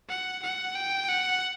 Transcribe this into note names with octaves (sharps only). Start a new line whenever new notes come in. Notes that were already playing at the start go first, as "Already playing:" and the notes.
F#5
F#5
G5
F#5